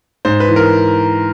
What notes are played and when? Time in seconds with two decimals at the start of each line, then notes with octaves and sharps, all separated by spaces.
0.25 G#2 C5
0.40 B4
0.48 E3
0.56 A#4